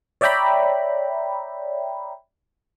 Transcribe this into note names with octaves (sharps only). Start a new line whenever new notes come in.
C#5 D5 E5 G5 A#5 B5